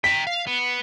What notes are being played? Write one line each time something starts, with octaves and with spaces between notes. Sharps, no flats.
G5 A#5 B6
F5
B3